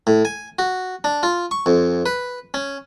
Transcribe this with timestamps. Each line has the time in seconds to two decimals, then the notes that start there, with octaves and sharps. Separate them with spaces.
0.07 A2
0.25 G#5
0.59 F#4
1.04 D4
1.23 F4
1.51 C#6
1.66 F2
2.06 B4
2.54 C#4